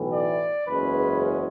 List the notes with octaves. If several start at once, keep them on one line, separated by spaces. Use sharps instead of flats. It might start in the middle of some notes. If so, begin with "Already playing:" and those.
Already playing: B1 A2 E3
D5
F#1 E2 C#3 G#3 C#4 B4